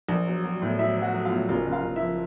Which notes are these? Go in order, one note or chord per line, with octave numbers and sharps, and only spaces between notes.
A#1
F#3
F#3
A2
F#3 E4 E5
F#3
F#4 F#5
F#3
F4 F5
A2
F#1 F4 F5
F#1
F4 F5
F#1
E4 E5
F3